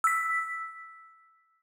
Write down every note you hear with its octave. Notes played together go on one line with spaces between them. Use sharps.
E6 B6